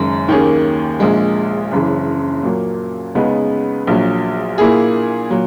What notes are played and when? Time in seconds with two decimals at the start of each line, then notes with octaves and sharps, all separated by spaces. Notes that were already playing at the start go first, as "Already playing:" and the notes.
Already playing: F#1 F#2 D#3 G#3
0.28 D#2 D#3 A#3 C#4 G#4
1.00 A#1 A#2 G#3
1.72 F#1 F#2 C#3 E3
2.43 A#2 F#3 A#3
3.15 C#2 C#3 G#3 B3 D#4
3.87 A#1 A#2 F#3
4.58 A#2 A#3 E4 G#4
5.30 A#2 F#3